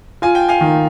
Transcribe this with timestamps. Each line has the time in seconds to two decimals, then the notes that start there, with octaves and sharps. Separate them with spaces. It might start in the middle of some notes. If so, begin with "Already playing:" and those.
0.22 F4 G#5
0.35 G5
0.48 F5 G#5
0.61 D#3